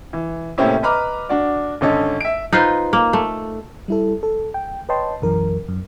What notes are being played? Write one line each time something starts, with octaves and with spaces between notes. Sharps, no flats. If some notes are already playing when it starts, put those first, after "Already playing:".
E3
A2 C3 A#3 C4 C#4 E4
B4 D#5 A#5 B5 D6 F6
D4 F#4 D5
G#1 D3 C#4 A4 D#5
E5 D7
D#4 F4 B4 C5
A#3
A3
G3 E4 A4
A4
G5
B4 C#5 D#5 G5 A5 C6
B1 F#2 E3 A#4
F#2